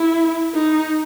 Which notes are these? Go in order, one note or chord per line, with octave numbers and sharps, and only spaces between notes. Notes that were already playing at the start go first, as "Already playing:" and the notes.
Already playing: E4
D#4